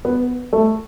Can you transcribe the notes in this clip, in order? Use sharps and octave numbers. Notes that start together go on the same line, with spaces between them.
B3
A3